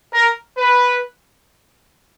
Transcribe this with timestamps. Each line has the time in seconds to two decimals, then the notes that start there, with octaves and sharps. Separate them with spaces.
0.12 A#4
0.56 B4